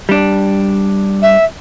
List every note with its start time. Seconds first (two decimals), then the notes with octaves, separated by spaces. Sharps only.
0.09 G3 D4
1.22 E5